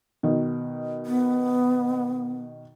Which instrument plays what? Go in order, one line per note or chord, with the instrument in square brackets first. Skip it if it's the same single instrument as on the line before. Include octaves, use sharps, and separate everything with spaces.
[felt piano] B2 D#3
[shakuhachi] B3